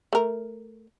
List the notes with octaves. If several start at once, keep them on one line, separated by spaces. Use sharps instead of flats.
A3 A#4